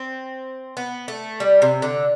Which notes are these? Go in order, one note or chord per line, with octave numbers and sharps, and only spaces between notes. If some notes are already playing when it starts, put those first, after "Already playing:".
Already playing: C4
B3
A3
G3
C3
D3